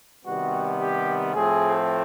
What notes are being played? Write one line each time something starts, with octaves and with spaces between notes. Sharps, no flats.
C3 D#3 G3 B3 F#4
G4
A2 F3 A3 C4 G#4